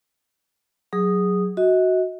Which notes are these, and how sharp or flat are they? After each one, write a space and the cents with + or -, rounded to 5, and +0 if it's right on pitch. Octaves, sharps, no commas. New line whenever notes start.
F#3 +0 G#4 -10 D#6 -5
F#4 +0 D#5 +40